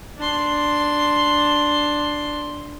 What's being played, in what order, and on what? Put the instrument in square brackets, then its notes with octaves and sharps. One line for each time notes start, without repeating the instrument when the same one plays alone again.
[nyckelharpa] D4 C6